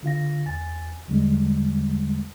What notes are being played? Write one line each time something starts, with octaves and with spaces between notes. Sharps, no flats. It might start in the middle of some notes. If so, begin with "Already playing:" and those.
D3 F4 F5 A#6
E2 G#5 A6
E2 D3 G3 G#3